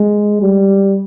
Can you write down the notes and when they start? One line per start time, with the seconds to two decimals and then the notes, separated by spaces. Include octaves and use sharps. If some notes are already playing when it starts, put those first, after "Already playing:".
Already playing: G#3
0.42 G3